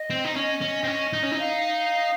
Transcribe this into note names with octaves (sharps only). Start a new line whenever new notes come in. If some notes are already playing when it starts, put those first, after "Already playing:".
Already playing: D#5
C4
D#4
C#4 D#5
C#4
C4
C#4
D#4
C#4
D#4
F5